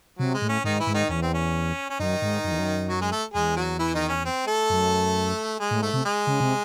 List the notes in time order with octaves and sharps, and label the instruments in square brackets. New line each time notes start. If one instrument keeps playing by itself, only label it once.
[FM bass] C3 [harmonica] F#3
[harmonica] G#3
[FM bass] A2
[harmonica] C#4
[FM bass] G#2 [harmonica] D#3 D#4
[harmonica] E3 E4
[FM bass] G#2
[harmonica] D#3 D#4
[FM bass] E2 [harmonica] C#4
[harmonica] C4
C#4
C#4
[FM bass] F#2 [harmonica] D#3 D#4
[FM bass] G#2
F#2
E2
F#2
[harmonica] F#3 F#4
G#3 G#4
A3 A4
[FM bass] E2 [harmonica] G#3 G#4
[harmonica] F#3 F#4
E3 E4
D#3 D#4
C#4
C4
A3 A4
[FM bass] F#2
[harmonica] G#3 G#4
[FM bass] A2
[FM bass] G#2 [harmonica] A3 A4
[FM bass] C3
[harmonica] G#3 G#4
[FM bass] C#3
C3